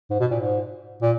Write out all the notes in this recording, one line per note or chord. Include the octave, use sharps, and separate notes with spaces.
G#2
B2
A#2
G#2
A#2